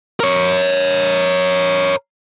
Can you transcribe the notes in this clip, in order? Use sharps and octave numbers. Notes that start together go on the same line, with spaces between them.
A#4 C#5